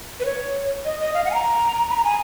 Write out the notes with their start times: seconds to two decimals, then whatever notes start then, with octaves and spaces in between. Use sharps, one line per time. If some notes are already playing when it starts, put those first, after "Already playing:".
0.20 B4
0.25 C#5
0.85 D#5
1.00 D#5
1.14 F5
1.25 F#5
1.31 G#5
1.34 A#5
1.90 B5
1.96 A#5
2.04 G#5